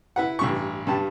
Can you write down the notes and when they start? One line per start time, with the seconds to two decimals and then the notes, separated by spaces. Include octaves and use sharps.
0.16 E4 B4 F#5
0.39 A1 G2 C#6
0.87 G2 G3 A5